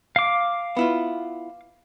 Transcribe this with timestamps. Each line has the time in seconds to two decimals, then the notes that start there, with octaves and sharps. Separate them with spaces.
0.16 F5 D6
0.77 B3 E4 F4